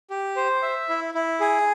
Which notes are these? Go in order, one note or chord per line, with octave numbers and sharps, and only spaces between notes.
G4
C5
E5
E4
E4
G#4